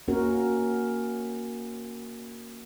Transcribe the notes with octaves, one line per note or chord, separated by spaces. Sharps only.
A#3 C#4 F#4 A#4